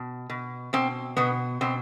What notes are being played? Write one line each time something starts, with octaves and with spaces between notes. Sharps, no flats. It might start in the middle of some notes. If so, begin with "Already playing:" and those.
Already playing: B2
B2
B2 C4
B2 B3
B2 C4